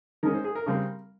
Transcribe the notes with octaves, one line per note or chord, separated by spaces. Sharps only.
D#3 G#3 C#4 A#4
C5
G#4
A#4
C#3 G3 C4